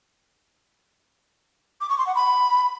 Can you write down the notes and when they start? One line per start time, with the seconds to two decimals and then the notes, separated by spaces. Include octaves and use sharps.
1.81 D6
1.89 C#6
1.98 C6
2.07 F#5
2.15 B5